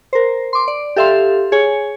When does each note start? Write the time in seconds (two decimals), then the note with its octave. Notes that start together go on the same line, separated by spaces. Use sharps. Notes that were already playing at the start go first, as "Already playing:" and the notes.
0.13 A#4 C5
0.53 C6 D6
0.68 D5
0.96 G4 A4 E5 F5 C6
1.52 G#4 C#5 G#5